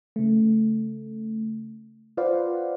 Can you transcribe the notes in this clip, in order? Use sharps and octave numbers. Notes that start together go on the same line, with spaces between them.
C#3 A3
F4 B4 C5 D5 F5 F#5